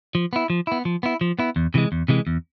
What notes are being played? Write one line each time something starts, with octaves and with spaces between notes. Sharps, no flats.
F3
B3 E4
F3
B3 E4
F3
B3 E4
F3
B3 E4
E2
C3 E3 G#3
E2
C3 E3 G#3
E2